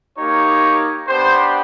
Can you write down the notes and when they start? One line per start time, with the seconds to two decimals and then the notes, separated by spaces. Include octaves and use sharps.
0.18 A#3 D#4 G4 C#5
1.08 B3 D4 G4 C5